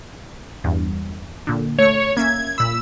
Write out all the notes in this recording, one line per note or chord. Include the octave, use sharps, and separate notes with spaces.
E2 G2
A#2 D3
A3 C#5 C#6
A#3 C#4 E5 G#6
A#2 B5 E6